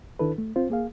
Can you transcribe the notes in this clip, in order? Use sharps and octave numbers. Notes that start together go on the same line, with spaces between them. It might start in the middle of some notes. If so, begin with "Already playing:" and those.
D#3 D4 E4 A4 B4
A3
C4 F4 C5
A#3 G#4 F5